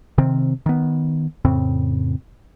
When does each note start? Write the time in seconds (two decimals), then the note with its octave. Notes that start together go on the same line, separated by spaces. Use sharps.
0.18 C3 D#3 C4
0.66 D#3 B3
1.45 F2 A2 C#3 C4